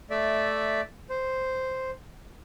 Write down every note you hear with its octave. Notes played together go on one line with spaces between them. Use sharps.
A3 D5 E5
C5